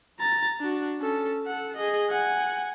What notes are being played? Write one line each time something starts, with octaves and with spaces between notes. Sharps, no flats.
A#5 A6
D4 F#4
C#4 A4
A4 F#5
G#4 D#5
F#5 G#5